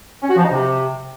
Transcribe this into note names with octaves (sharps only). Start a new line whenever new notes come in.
C#4
F#4
F3
D#4
C3